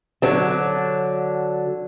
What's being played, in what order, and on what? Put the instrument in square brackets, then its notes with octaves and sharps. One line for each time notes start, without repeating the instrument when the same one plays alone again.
[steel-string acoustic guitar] D3 F#3 D4